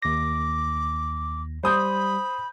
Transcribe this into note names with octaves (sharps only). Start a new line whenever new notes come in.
D#2 D6 A#6
G3 C5 B5 D#6 G6